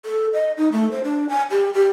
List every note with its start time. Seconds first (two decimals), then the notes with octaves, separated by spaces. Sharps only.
0.05 A4
0.33 D#5
0.57 D#4
0.72 A3
0.91 C5
1.03 D4
1.29 G#5
1.50 G4
1.74 G4